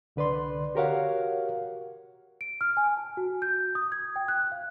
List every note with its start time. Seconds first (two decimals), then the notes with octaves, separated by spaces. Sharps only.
0.16 C2 D3 B4 D5 C6
0.75 F#4 G4 A#4 C#5 F5 F#5
2.41 D7
2.61 F6
2.77 G#5
2.97 A5
3.17 F#4
3.42 G6
3.75 D#6
3.92 G#6
4.16 G5
4.28 F#6
4.52 F5